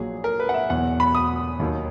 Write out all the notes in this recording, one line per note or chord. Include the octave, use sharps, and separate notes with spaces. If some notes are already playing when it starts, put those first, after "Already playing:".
Already playing: A#1 A#2 F#3 G#4
A#4
B4
F#5
E5
E2 B2 F#3 F#5
B5
D#6
D#2 D#3 F#3